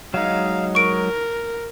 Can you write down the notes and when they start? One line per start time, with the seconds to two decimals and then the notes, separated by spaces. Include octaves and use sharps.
0.14 F#3 G#3 D#4 F5
0.75 A#4 C#6 D7